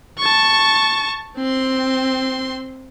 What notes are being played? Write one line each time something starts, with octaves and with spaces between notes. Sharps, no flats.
A5 C#6
C4 C6